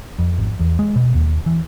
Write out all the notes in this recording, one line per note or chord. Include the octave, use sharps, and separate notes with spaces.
F2
G#1
E2
G#3
B2
D#2
E3